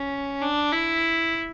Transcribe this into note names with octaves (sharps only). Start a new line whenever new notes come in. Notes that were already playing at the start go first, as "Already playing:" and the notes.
Already playing: C#4
D4
E4